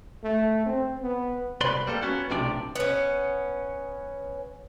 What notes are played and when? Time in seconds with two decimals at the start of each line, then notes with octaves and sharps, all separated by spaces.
0.23 A3
0.66 C4
1.02 B3
1.61 C2 B4 D5 B5 C6
1.87 G3 A#3 A4
2.02 B3 C#4 F#4
2.30 B1 A2 C3 F3 D4 D5
2.76 B3 C#4